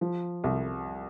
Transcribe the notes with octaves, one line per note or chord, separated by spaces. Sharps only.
F3
C2